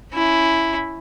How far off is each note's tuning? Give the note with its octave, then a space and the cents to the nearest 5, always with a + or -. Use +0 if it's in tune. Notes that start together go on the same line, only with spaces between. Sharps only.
C#4 +15 E4 +0